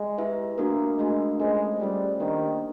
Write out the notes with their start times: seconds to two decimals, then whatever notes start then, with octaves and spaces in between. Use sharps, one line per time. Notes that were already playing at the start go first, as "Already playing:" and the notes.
Already playing: G#3
0.18 E4 G4 B4 E5
0.58 A3 A#3 D4 F#4 A#4
0.98 G#3 A3 D4 F#4 A#4
1.39 G#3 A3 C#4 F4 A4 C5
1.79 G3 A3 C#4 F4 A4 C5
2.20 D#3 A#3 D4 G4 C5